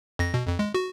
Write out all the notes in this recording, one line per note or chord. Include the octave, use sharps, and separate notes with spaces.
F2 A#6
B2
F2
G#3
F#4